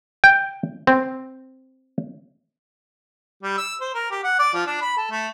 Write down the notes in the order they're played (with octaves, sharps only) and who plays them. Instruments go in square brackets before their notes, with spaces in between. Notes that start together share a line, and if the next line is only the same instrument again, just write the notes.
[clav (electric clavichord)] G5
C4
[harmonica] G3
E6
C5
A#4
G4
F#5
D5
F3
D4
B5
A4
A3